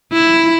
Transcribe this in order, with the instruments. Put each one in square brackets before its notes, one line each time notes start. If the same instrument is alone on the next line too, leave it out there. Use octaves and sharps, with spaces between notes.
[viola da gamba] E4